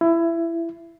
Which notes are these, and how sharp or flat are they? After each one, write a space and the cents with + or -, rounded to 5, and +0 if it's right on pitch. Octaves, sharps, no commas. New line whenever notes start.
E4 +20